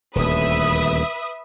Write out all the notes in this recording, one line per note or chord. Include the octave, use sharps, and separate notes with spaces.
D#1 D2 B4 E5 D#6